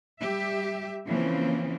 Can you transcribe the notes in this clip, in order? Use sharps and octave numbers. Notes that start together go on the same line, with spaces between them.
G3 G4 E5
C#3 E3 F3 A#3 C4